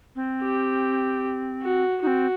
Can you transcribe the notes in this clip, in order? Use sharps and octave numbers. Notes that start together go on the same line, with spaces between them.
C4
G4
F#4
C4 D#4 F#4